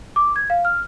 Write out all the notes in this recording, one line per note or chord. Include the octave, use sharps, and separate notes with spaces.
D6
G#6
F5
F6